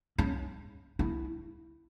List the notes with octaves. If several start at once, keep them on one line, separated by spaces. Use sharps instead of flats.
C#4
E4